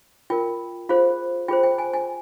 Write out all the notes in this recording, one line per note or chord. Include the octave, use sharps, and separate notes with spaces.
F4 A#4 G5
F4 G#4 C5 F5
F4 G#4 C5 G5
G5
G#5
G#5